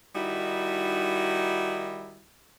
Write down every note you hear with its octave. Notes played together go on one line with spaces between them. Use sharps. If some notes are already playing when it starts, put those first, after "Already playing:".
D#3 G3 D#4 E4 F#4